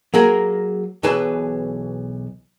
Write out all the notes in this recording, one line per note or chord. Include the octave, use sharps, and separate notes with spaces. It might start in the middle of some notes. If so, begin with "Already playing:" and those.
F#3 A#3 G#4 A#4
B1 B2 E3 G#4 B4 A5